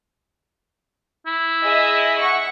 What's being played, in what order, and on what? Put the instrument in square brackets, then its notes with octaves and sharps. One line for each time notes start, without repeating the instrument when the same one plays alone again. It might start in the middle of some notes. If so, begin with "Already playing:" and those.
[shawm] E4
[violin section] G#4 D#5 E5
F#5 C#6